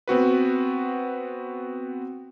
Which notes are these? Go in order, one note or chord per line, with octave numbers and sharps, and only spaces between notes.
B3 C4 F#4 B4